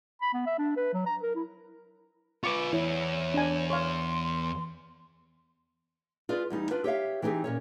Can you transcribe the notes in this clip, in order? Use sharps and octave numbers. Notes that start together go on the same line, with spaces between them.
B5
B3
E5
D4
B4
F#3
A#5
A#4
E4
F4 B4 C#6 D6
E2 E4 C#5
D4 G#5
C#5 F5 C6
F4 G#4 B4 D5
E2 G3 D#4
D4 F4 B4
G4 C#5 E5 F5
E3 C4 D#4 G4 G#4
A#2 C#4 C#5